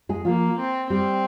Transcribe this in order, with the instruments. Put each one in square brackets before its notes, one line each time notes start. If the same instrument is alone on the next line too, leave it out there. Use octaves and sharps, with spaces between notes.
[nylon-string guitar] G#3 G#4
[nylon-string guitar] F3 F4 [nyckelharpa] A#3
[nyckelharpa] C4
[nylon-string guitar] G3 G4 [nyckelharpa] C4